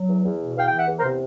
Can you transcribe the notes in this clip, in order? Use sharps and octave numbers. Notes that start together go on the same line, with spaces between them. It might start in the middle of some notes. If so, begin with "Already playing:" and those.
Already playing: F#3
E2
E2
B2
E2 F5 G5
E3 G5
E5 F#5
E2
A#4 C5
C3